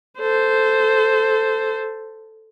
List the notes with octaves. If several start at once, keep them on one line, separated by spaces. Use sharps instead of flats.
A4 C5